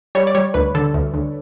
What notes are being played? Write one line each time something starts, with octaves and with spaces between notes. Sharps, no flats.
G3 C#5
D5
G3 C#5
D2 B4
D3 A4
D2
D2